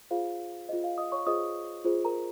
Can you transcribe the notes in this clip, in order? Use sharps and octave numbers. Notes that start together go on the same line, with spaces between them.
F4 G#4 C5 F5
F4 G#4 C5 D#5
F5
D#5 D#6
C#5 C#6
F4 G#4 C5 D#5 D#6
F4 G#4 C5
A#4 A#5